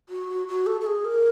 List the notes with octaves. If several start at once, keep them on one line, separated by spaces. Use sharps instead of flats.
F#4
F#4
A4
A4
G#4
A#4